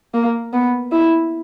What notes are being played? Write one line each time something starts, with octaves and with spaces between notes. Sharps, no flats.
A#3
B3
E4